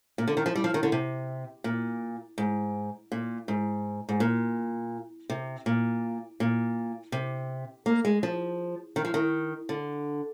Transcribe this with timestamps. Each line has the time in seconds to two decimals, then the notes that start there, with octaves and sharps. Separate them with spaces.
0.18 A#2
0.27 D3
0.37 D#3
0.46 F3
0.55 G3
0.64 F3
0.74 D#3
0.83 D3
0.92 C3
1.64 A#2
2.38 G#2
3.12 A#2
3.48 G#2
4.09 G#2
4.20 A#2
5.30 C3
5.66 A#2
6.40 A#2
7.12 C3
7.86 A#3
8.05 G#3
8.23 F3
8.96 D#3
9.05 F3
9.14 D#3
9.69 D3